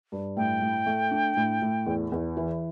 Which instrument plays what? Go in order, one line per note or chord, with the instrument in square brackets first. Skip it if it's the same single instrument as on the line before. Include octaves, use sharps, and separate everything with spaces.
[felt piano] G2
[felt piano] A2 [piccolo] G5
[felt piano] A2
A3
D4
A2
A2
E2
E2
E3